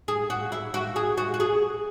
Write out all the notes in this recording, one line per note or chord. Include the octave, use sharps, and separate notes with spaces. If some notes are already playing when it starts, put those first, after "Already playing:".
G#4
F#4
E4
F#4
G#4
F#4
F#4
G#4